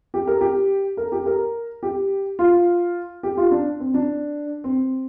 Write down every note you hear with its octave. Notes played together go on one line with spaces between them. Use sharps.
G4
A#4
G4
A#4
G4
A#4
G4
F4
G4
F4
D4
C4
D4
C4